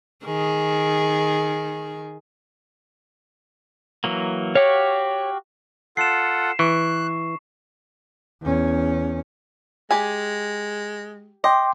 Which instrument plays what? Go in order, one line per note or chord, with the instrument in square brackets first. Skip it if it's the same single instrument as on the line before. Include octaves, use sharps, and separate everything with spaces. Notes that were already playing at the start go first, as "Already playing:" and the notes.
[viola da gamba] D#3 G#4
[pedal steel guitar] E3 F#3 A#3
[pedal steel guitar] F#4 G4 F5 [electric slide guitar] C#5
[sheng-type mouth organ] F4 A4 F#5 [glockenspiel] C7 E7
[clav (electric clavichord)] E3 [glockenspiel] C#6 [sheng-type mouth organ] F#6
[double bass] E2 C#4
[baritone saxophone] G#3 [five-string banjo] G4 G#5
[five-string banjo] D#5 [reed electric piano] G5 C6 D6